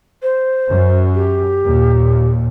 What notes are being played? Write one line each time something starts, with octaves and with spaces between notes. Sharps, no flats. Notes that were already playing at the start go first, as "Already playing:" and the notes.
C5
F#2
G4
D#2 A#2